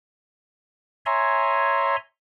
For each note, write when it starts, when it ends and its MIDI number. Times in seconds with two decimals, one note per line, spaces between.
1.06 1.96 73
1.06 1.96 76
1.06 1.96 80
1.06 1.96 82
1.06 1.96 84